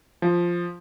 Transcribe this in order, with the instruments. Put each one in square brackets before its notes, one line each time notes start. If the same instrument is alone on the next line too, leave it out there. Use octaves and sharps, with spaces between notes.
[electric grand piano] F3